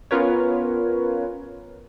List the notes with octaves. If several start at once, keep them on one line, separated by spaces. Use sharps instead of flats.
B3 C#4 F4 A#4 B4 C#5